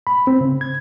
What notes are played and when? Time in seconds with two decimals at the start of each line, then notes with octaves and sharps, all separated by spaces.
0.07 B5
0.27 C4
0.41 C#3
0.61 G#6